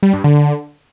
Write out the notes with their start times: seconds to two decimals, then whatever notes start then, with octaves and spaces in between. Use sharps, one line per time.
0.03 G3
0.13 G2
0.24 D3